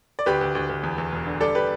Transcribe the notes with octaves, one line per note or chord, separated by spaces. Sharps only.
D5
D2 G4 B4
D2
D2
D2
E2
E2
E1
D3
G3 A4 D5
G4 B4